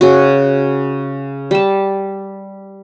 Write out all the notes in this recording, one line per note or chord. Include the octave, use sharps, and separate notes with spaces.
C#3 F#4
G3 A5